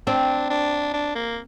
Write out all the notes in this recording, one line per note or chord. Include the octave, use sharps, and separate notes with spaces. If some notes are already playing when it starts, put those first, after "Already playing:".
C4 D4
D4
D4
A#3